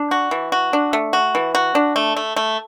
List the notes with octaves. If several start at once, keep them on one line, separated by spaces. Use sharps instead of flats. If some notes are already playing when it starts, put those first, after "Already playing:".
Already playing: D4
F#4
E3
F#4
D4
A3
F#4
E3
F#4
D4
A3
A3
A3